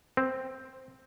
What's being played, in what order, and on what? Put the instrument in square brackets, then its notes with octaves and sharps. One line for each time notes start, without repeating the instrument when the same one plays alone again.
[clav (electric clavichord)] C4